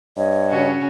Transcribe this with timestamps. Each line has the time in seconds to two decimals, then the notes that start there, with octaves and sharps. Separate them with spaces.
0.17 G2 C#5 D#5
0.50 C#3 C#4 F#4